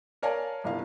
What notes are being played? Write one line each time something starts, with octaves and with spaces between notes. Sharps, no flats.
A#4 C#5 D5 F5 G#5 A5
G1 C2 F5